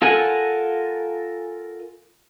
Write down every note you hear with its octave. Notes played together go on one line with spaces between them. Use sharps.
F4 A4 A#4 F#5 G#5